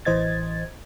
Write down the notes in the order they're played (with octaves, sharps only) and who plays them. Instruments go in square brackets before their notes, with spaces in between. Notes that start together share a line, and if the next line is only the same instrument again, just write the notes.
[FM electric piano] A1 E3 C5 D#5 G#6 A6